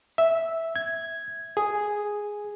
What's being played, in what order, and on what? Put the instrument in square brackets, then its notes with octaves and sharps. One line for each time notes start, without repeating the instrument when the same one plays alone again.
[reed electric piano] E5
G#6
G#4